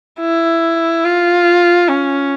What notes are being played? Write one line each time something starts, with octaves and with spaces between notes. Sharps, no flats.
E4
F4
C#4